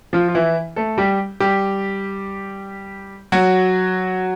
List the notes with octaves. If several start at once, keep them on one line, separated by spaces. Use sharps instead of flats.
F3 F4
F4
E3 E4
A3 A4
G3 G4
G3 G4
F#3 F#4